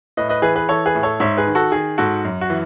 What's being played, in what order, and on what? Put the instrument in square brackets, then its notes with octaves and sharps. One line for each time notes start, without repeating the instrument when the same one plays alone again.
[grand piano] A2 B4 D#5
B4 D#5
E3 G#4 B4
G#4 B4
E3 A4 C#5
G#4 B4
A2
A4 C#5
G#2 C#5 E5
G#4 B4
D#3
F#4 A4
D#3 G#4
G#2 F#4 A4
F#2
F#4
E3